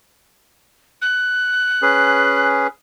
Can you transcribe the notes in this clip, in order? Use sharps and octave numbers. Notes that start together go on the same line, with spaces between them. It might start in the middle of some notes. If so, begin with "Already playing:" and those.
F#6
C#4 G#4 B4